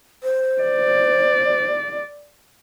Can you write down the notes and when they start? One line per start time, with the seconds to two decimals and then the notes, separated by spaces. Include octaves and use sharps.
0.23 C5
0.62 D5